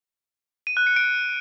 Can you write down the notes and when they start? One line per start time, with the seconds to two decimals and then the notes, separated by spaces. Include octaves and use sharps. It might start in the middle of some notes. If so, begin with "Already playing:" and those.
0.67 D#7
0.77 F#6
0.87 C#7
0.96 D7